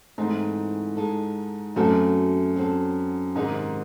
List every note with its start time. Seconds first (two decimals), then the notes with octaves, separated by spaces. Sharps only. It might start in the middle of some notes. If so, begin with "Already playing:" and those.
0.18 G#2 E3 A3 C4 D#4
0.97 G#3 D#4 A4
1.76 F#2 F#3 A3 C4 F#4 A4
2.56 F#3 C4 F#4 A4
3.35 G#2 C3 D#3 G#3 D#4 G#4